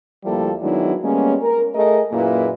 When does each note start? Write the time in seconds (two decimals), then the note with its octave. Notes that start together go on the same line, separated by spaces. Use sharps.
0.24 D2 F3 G3 A#3 E4 A4
0.62 D#3 F#3 G#3 B3 D4 E4
1.02 G3 G#3 A#3 B3 C#4
1.42 A#4
1.74 A3 G#4 A#4 D#5
2.12 F#2 A#2 A#3 E4 G#4 B4